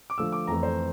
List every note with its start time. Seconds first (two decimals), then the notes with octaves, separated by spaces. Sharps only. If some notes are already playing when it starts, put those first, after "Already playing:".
0.10 D6
0.18 D3 F3 A3 E6
0.32 D6
0.47 F2 E3 A3 A#5
0.63 C5